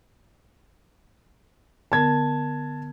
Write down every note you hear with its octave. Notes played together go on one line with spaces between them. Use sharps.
D3 B3 A#4 A5 G#6